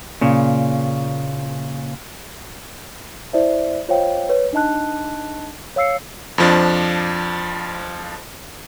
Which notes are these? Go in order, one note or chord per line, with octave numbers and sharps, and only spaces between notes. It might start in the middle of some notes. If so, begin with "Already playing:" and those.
A#2 C#3
E4 C5 D5 E5
F4 C5 C#5 D#5 F5 G5
B4 C#5
D4 D#4 D#5 A5 F#6
C#5 F5 E6 C7 C#7
F2 F3 D4